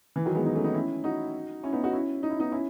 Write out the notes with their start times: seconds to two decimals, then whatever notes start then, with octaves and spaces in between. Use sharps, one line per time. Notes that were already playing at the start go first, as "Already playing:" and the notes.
0.16 E3
0.26 D#3 F#3
0.35 G#3 B3
0.45 B3 D#4
0.55 A3 C#4
0.64 B3 D#4
0.74 C#4 E4
1.04 D#4 F#4
1.63 C#4 E4
1.73 B3 D#4
1.83 D#4 F#4
1.93 C#4 E4
2.23 D#4
2.31 E4
2.40 B3 D#4
2.52 C#4 E4